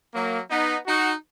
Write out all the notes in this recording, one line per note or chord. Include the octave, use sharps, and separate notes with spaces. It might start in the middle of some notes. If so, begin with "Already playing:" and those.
F#3 A#3
B3 D#4
D#4 F#4